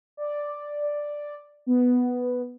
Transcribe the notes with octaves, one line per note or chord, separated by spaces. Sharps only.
D5
B3